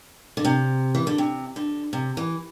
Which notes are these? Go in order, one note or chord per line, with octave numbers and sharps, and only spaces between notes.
D3
C3
E3
D3
C3
D3
C3
E3